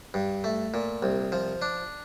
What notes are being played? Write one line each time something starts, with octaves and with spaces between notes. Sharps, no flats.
G2
A3
A#2
C2
F3
D4